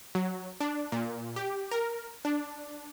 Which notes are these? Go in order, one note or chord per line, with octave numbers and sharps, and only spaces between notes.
F#3
D4
A#2
G4
A#4
D4